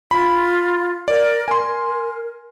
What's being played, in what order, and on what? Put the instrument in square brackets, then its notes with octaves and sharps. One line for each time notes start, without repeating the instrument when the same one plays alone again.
[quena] F4 [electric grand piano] B5
[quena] A#4 [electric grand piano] D5
[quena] A#4 [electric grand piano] G#5 C6